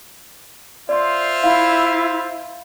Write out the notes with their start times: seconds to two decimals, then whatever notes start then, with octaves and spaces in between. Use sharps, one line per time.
0.89 F4 C5 D5 E5 C6
1.44 E4 F5